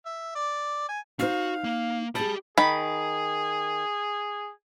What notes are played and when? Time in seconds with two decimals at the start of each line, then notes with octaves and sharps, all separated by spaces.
0.06 E5
0.35 D5
0.89 G#5
1.19 D#4 F#4 C5 F5
1.64 A#3
2.15 G4 G#4 D#5 A5 B5
2.58 D#3 G#4 B5